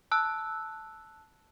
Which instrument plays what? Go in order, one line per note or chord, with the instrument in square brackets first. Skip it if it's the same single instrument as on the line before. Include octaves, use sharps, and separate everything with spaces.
[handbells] A5 E6 F#6